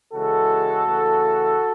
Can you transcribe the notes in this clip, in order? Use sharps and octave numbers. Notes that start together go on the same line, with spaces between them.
C#3 E3 G#3 F#4 A4
C#3 E3 A3